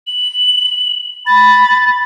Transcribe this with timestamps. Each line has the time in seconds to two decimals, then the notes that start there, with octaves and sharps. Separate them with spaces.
0.07 F#7
1.27 B5 A6